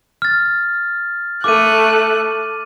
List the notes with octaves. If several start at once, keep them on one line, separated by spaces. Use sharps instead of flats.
F6 A6
A3 D6 F#6 D#7